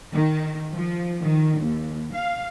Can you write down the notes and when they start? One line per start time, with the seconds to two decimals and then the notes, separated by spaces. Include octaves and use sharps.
0.13 D#3
0.73 F3
1.21 D#3
1.58 D#2
2.13 F5